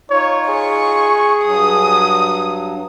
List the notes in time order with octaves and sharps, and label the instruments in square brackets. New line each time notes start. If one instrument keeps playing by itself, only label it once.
[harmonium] D#4 F4 [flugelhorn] C#5
[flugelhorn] G#4 [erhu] C#6
[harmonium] G2 F#3 [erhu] D#6